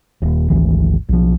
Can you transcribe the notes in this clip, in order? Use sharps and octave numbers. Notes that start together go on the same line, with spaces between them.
D#1
G#1 D2 E3
B1 F3